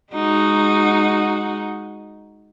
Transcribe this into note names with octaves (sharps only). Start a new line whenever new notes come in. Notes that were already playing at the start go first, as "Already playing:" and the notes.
G#3 D#4 F#4